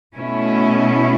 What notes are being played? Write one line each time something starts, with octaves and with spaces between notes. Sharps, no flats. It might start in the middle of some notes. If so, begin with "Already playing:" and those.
B2 A3 C#4 E4